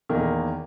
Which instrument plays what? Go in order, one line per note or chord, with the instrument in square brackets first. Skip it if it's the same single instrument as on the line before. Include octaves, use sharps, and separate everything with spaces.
[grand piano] E2 D#3 A#3